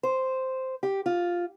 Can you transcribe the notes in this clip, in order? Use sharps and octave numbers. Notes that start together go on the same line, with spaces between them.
C5
G4
F4